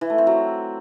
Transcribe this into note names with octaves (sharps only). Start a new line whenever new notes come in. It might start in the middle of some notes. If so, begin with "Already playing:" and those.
E3
A3
C4
F#3